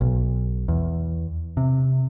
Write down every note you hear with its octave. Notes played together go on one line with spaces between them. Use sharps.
B1
E2
C3